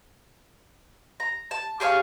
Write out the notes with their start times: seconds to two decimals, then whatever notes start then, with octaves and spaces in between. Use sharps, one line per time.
1.20 A#5
1.51 A5
1.80 G4 G#4 C#5 F5